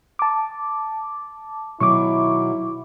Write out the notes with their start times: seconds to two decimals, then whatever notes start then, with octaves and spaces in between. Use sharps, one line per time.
0.19 A5 D6
1.80 B2 D#3 F#3 E4 C#6 D6